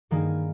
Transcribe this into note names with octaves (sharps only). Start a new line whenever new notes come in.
G2 D#3 A#3 D#4 G#4